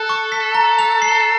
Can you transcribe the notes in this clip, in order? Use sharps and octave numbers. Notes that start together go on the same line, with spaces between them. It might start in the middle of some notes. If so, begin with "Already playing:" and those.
Already playing: A4 F#6
C#6
B6
A#5
F7
C7